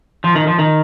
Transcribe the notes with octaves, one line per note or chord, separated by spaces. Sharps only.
F3
D#3
F3
D#3